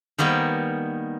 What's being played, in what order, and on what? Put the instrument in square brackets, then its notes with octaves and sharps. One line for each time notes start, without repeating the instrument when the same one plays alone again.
[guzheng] D#3 G3 A#3 B3